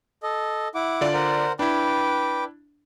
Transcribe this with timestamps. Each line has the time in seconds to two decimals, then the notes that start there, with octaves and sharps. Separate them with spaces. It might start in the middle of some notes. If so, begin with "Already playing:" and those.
0.23 A4 D#5
0.75 E4 F#5 D6
1.01 D3 F4 D5
1.14 A#4 C5 F#5
1.59 D4 E4 B4 G5 D6